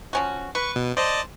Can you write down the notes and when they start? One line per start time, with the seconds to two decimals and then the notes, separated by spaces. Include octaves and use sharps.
0.13 F3 C#4 F#4
0.55 B4 C#6
0.76 B2
0.97 C5 D5 D#5 A5